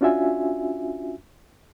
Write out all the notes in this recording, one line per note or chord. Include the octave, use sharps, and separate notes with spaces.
C#4 D4 F4 F#4 E5 G#5